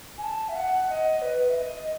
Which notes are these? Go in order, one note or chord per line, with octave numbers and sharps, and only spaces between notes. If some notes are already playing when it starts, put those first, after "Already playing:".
G#5
A5
E5
F#5
D#5
B4
E5
D#5